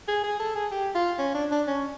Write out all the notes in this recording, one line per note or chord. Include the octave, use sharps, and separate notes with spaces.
G#4
G#4
A4
G#4
G4
F4
C#4
D4
D4
C#4